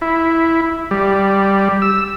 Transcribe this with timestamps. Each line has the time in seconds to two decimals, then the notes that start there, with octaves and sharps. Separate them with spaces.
0.01 E4
0.91 G3
1.82 E6